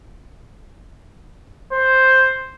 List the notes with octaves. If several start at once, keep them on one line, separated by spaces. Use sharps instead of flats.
C5